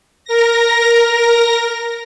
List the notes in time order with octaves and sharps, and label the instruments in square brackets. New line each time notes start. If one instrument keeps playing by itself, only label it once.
[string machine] A#4 A#6